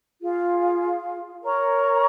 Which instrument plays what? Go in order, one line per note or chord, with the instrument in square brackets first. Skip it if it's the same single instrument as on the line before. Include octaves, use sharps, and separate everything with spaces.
[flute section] F4 G#4 F5
A#4 C#5 A#5 C#6